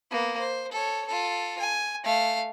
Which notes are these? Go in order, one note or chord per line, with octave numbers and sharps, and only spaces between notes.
A#3 B3
C5
A4 C#5
F4 A4
G#5
A3 F5